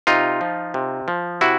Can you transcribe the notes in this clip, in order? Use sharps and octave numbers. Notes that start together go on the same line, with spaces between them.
C3 D#4 F4
F3
C3
F3
C3 E4 F#4